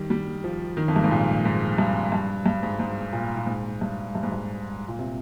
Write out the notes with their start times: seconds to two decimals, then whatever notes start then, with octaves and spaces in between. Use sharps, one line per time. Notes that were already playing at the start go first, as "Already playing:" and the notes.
Already playing: D#3 G3
0.10 G3
0.44 F3
0.77 D#3
0.88 F2
0.96 G2
1.04 G#2
1.11 A#2
1.45 G#2
1.78 G2
2.12 G2
2.46 G2
2.63 G#2
2.79 G#2
3.13 A#2
3.37 A#2
3.46 G#2
3.81 G2
4.15 G2
4.23 G#2
4.32 G2
4.88 A#2
4.99 C3